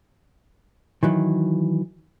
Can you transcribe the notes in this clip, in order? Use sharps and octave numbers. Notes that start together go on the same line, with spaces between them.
D#3 E3 F#3